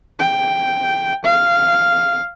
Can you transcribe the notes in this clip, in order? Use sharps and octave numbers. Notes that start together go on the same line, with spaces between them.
G5
F5